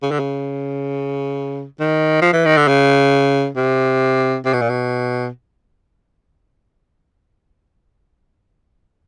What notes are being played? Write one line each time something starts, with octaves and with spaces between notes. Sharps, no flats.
C#3
D3
C#3
D#3
F3
E3
D#3
D3
C#3
C3
C3
B2
A#2
B2